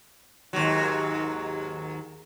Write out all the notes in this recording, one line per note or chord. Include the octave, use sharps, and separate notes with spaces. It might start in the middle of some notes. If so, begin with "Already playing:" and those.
D#2 G#2 F#3